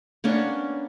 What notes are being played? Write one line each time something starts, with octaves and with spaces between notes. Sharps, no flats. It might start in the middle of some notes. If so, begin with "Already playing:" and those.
A#3 B3 C#4 D4